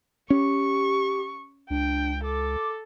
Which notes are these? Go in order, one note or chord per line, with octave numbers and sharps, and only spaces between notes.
C#4 G4 C#6
C#2 D4 G5
A4 D6